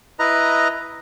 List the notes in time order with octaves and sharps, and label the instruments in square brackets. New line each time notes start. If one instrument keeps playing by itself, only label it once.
[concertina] E4 B4 D#5 A#5